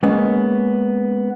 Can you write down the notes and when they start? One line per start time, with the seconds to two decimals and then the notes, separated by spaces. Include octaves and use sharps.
0.03 G#3 A#3 B3 C#4